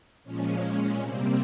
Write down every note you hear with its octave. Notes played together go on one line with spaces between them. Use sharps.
A#2 F3 G#3 C#4
A#2 G#3
C3 G3 A#3 C4